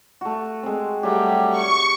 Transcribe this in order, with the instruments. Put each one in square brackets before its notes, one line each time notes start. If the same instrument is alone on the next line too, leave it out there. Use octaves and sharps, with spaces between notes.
[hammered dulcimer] A3 F#4
G#3 C4
[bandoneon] F#3 G3 A3 [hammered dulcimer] G4
[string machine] C#6